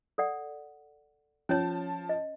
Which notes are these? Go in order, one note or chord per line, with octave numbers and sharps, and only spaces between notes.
A4 D5 F#5
F3 C#4 C#5 A5
D#5